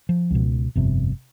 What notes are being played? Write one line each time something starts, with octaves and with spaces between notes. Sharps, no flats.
F3
C#2 B2
G1 F2 C3